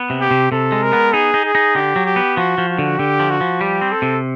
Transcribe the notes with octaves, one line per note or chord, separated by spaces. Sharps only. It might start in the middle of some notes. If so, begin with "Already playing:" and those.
Already playing: B3
C3
G4
C3
C3 A4
G#3
A#4
B3
D#4 G#4
D#4
G#4
D#4
D3 G4
F#3
G4
B3
F3 F#4
F3
F#4
D3
D3 G4
F3
F#4
F3
G3 G4
C4
A4
C3